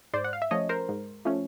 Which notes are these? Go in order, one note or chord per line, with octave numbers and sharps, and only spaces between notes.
G#2 C5 D5
F#5
F5
E5
F3 A3 C#4 C#5 D#5
A#4 C5
G#2
F3 A3 C#4